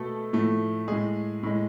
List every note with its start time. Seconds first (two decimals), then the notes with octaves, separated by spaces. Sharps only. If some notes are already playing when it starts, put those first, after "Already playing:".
Already playing: B2 A3 A4
0.33 A2 F3 A3
0.88 A2 G#3 G#4
1.43 A2 G#3